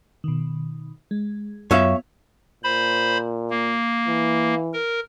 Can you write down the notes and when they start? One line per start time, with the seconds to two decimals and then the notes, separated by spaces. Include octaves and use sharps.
0.24 B2 D#3
1.11 G#3
1.71 F#2 B3 F4 C#5 E5 F5
2.64 A#2 C5 B5
3.51 A#3
4.08 E3
4.73 A#4